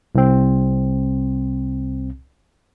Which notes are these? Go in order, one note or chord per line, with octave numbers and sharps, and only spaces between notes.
C2 C4